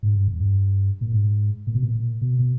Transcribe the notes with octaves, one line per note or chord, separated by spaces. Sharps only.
G#2
G2
E2
G2
A#2
G#2
A#2
B2
A#2
A#2
B2
B2